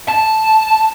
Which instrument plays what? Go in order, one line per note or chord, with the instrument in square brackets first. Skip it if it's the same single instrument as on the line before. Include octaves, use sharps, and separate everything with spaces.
[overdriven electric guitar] A5